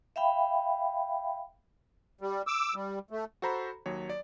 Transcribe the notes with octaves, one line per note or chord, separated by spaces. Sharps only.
E5 F5 G5 B5
G3
D6 E6
G3
A3
F#4 A4 C5 A#5 B5
D#2 F#3 C#5
D5